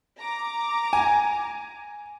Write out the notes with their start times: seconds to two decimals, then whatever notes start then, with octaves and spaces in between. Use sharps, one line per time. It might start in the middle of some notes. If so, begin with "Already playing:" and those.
0.19 A#5 D6
0.93 G#5